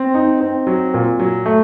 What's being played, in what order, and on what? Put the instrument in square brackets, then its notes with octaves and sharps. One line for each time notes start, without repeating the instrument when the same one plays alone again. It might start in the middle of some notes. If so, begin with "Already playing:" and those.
Already playing: [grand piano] C4
D#4
C4
F#3
A#2
F#3
A3